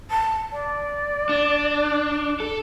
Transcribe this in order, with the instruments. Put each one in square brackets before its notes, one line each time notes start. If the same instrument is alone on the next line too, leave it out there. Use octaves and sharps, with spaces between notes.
[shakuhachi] A5
D5
[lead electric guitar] D4
A4